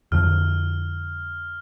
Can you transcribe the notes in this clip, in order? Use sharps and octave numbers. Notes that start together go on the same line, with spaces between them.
F2 D3 F3 F6